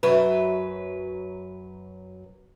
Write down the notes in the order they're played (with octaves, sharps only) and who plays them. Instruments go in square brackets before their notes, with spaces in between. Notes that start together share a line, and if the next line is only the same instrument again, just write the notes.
[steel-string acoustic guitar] F#2 F#3 B4